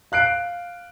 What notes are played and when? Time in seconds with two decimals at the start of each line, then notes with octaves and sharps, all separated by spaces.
0.12 F5 F#6 C7 D7